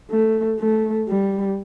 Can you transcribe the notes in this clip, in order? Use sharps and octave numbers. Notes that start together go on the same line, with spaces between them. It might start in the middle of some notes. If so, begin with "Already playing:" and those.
A3
A3
G3